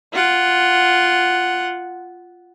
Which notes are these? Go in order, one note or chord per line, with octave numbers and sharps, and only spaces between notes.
F4 F#5